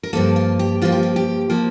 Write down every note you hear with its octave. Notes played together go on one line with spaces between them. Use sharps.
A#4
G2 F3 A#3 A4
F4
G4
G2 F3 A#3 F4
G4
F4
G4
F3 A#3